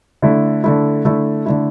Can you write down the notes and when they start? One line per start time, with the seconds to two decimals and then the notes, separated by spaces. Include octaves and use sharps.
0.22 D3 A3 E4
0.64 D3 A3 E4
1.05 D3 A3 E4
1.46 D3 A3 E4